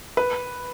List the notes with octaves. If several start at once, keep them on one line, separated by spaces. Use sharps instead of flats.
B4